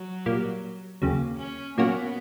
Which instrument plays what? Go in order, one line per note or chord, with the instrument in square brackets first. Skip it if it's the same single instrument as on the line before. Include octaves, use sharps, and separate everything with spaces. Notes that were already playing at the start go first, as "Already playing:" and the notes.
Already playing: [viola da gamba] F#3
[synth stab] A#2 G3 A#3
[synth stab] D#2 C#3 F#3 [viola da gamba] A#3
[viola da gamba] C#4
[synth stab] A#2 F#3 A#3 C#4 F#4 [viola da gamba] B3